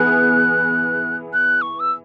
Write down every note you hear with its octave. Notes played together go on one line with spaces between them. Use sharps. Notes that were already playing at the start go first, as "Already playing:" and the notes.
Already playing: E3 B3 E4 G#4 F#6
F#6
C#6
E6